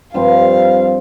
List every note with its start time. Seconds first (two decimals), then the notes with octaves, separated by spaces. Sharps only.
0.14 G2 F3 C4 F5